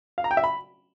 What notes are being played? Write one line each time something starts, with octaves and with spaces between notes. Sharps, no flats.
F5
A#5
G5
E5
B5